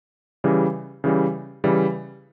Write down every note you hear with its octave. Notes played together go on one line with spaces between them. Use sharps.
C#3 E3 G3
C#3 E3 G3
C#3 E3 G3